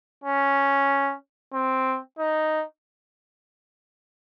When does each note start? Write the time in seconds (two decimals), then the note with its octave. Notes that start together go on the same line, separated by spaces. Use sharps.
0.24 C#4
1.53 C4
2.18 D#4